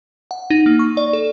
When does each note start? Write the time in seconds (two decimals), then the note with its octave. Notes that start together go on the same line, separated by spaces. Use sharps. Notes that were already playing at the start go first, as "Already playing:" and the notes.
0.31 F#5
0.50 D#4
0.66 A#3
0.79 C#6
0.97 D5
1.13 A4